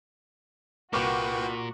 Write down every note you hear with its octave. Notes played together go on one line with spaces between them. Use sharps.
C2 A#2 A#3 F#4 B4 G5 C#6 D6